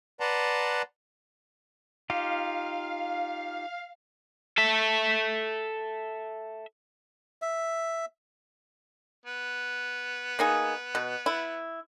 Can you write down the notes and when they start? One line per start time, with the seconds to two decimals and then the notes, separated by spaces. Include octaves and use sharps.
0.20 B4 D5 F#5 A5 A#5 C6
2.10 D#4 F4 G4 F5
4.58 A4 E5
7.42 E5
9.26 B3
10.39 A#3 D#4 G#4
10.95 B2
11.26 E4